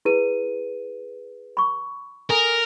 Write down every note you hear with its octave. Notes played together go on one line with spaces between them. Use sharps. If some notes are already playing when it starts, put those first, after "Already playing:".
E4 G#4 B4 D#7
B5 C#6
A4 A#4 G#5 D#6